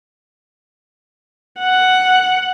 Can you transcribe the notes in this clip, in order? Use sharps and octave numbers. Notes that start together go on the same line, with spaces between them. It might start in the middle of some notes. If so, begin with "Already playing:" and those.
F#5